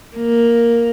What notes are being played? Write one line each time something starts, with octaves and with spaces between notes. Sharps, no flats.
A#3